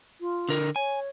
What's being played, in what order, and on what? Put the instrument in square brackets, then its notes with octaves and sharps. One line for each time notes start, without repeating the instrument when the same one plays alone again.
[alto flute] F4
[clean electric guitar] D3 A#4
[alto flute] C#5 [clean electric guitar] G#5